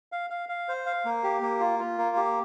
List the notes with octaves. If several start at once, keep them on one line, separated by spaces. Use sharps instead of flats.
F5
F5
F5
C5
F5
A#3
G4
A#3
F4
F4
A#3
G4